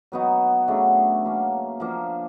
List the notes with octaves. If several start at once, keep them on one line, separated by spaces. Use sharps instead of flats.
F#3 B3 D#4 F#4
C#3 F#3 A3 D4
F#3 A#3 C#4
F3 A#3 D4